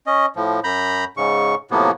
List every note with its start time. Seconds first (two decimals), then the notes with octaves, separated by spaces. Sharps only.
0.07 C#4 D#5
0.36 A2 F3
0.64 F#2 A#5 B5 G6
1.17 G#2 C#3 C#6
1.71 A2 C3 F3 F#3 A#3 B3